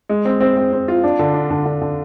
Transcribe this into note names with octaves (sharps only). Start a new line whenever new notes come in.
G#3
C4
C4
C4
C4
F4
D4
D3
D4
D3
D3
D3